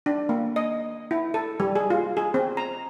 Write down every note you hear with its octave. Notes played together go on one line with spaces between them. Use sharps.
D4
A#3
D#5
E4
A4
G3
G#4
F4
G#4
C4
A#5